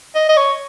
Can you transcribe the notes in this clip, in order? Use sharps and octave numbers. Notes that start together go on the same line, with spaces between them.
D#5
D#5
C#5